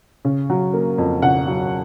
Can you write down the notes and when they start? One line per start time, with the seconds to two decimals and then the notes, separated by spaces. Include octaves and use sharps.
0.25 C#3
0.50 F#3
0.74 A#3
0.98 F2
1.22 C#3 F#5
1.47 F#3